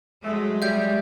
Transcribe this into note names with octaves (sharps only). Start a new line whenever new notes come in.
F#3 G#3 A3
G3 E5 G6